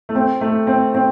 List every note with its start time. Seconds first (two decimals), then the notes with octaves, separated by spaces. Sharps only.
0.09 A3
0.15 C4
0.41 A3
0.67 C4
0.95 C4